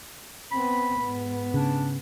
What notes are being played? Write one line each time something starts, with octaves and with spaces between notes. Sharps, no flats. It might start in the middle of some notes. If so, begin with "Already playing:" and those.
B3 C4 B5
G#2 B3
C#3 D4